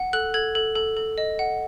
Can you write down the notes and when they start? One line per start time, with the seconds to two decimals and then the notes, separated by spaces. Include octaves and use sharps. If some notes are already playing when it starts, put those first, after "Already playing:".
Already playing: F#5
0.13 A4 F#6
0.34 A4 G#6
0.55 A4
0.76 A4
0.97 A4
1.18 D#5
1.39 F#5